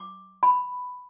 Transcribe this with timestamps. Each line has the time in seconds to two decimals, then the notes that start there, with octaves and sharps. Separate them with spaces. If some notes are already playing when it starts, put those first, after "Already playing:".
Already playing: D6
0.43 B5